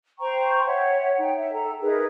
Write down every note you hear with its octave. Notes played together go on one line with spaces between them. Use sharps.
C5 G5 A#5 C#6
C#5 E5 F#5
D#4 G5
E5
A4 A#5
D#4 G#4 A#4 B4